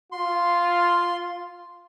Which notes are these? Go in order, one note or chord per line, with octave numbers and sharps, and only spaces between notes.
F4 C6